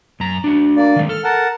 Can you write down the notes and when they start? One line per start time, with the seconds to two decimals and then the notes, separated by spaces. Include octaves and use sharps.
0.20 F#2 A#5
0.44 D4 F#4
0.77 A#3 D5
0.96 D#3 G#3
1.09 A4 F6
1.24 A#4 F#5 A5